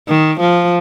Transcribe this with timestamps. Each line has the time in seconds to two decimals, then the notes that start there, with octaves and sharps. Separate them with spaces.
0.08 D#3
0.40 F3